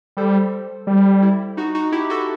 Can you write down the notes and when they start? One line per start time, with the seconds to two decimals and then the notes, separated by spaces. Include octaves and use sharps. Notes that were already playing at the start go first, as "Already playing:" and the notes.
0.17 G3 A4 C5
0.87 G3
1.22 E4
1.57 D#4 F#4
1.75 D#4 F#4
1.92 E4 G4
2.10 F#4 A4